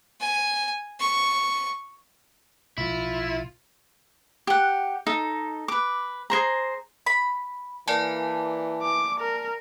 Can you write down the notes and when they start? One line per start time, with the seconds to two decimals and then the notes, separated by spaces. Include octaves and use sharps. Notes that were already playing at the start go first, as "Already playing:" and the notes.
0.20 G#5
1.00 C#6
2.78 B1 B2 F3 E4 F4
4.47 G4 F#5
5.07 D#4 A4
5.68 B4 D6
6.30 G#4 A#4 C5 A#5
7.06 B5
7.88 E3 A#3 D5 G#5 A5
8.83 D6
9.20 A#4